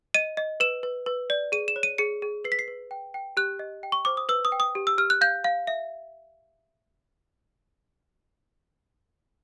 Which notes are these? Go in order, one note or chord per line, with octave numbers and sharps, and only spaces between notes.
D#5 D#7
D#5
B4 E7
B4
B4
D5
G#4 D#7
E7
C#5
D#7
G#4 C#7
G#4
B4 C7
B6
C7
B4
G5
G5
G4 F#6
D#5
G5
C#6
C5 D6
D#6
B4 E6
D#6
G5
D#6
G4
E6
G4 F6
F#6
F5 G6
F5
E5